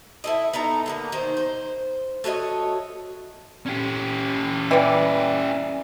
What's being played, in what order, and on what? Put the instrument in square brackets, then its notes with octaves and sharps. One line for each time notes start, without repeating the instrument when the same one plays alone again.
[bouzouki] E4 A4 D#5
B3 D#4 A4 A#5
D3 G#3 A#3
D#3 D#4 C5
C5
A3 F#4 C#5 D#5
[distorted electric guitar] C#4 G4
[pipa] E3 G3